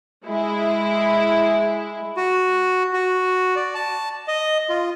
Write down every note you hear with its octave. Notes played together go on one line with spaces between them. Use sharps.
G#3 E4
F#4
F#4
D5
A5
D#5
F4